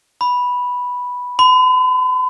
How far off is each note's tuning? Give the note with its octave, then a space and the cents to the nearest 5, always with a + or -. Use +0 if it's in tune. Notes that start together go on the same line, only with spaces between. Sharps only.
B5 -5
B5 +45